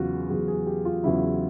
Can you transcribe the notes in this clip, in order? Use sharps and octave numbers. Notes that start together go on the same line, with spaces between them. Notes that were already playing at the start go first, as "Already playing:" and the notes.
Already playing: E2 C#3 F#3 F4 F#4
E2 C#3 F#3 G#4
G#4
G4
F4
E2 C#3 F#3 E4